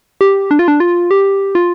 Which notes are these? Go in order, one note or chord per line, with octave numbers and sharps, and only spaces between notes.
G4
D4
F4
D4
F4
G4
F4